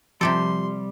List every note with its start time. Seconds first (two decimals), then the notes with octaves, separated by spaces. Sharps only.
0.21 C3 F3 G3 G4 A4 C6